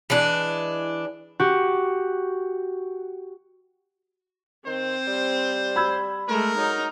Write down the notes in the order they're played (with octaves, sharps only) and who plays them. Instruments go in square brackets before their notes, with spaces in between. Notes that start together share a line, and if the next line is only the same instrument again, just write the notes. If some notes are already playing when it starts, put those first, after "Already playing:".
[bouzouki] E3 G#3 D4
[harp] F#4 G4
[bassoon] D#3 [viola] C4 [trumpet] C5
[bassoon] G3
[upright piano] B5 E6 G#6
[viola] G#3 A3 [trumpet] A#4
[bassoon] F#3 [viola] D#4